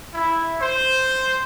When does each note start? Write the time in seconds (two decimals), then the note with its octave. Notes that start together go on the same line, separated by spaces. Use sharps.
0.14 E4
0.62 C5